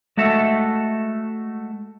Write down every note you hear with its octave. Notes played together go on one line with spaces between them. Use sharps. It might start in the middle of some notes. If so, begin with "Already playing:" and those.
G#3 A3 F#4 A4 E5